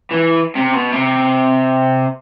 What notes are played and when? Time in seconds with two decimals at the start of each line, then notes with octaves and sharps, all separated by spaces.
0.11 E3
0.55 C3
0.74 B2
0.92 C3